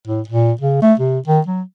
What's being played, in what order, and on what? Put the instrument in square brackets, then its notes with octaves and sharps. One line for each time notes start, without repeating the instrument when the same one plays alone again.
[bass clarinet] A2
A#2
C#3
A3
C3
D#3
F#3